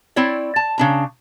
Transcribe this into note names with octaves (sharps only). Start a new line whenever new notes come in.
C4 E4 C#5 D5
A5
C#3 D4 A#5